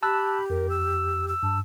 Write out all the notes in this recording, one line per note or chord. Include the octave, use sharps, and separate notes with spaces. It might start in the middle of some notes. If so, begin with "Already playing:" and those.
G4 A5 B5 E6 F#6
F2 A#4
E6
E6
G2 A5